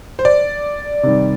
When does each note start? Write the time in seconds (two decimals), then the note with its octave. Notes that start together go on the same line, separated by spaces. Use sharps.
0.19 C5
0.25 D5
1.03 C3 D#3 G3